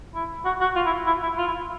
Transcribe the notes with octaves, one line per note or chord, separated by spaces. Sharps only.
E4
F#4
F#4
F4
E4
E4
E4
F4
E4